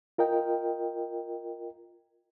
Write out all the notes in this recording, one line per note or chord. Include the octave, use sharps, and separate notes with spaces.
F4 A#4 D#5 G5